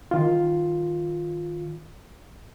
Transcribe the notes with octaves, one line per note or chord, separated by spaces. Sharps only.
D#3 F4